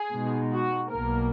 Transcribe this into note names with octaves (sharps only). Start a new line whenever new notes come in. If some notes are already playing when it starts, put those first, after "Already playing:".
Already playing: G#4
B2 G#3 D#4
F#4
B1 B2 A#3 A#4